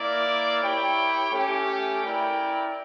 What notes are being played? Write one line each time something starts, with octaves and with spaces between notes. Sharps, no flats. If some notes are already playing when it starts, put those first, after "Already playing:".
Already playing: A#3 E4 A#4 D5
E4 G4 C#5 G5
A3 C#4 G4
E4 A#4 D5 G5